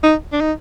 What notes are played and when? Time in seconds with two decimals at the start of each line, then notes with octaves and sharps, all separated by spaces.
0.03 D#4
0.32 D4
0.41 D#4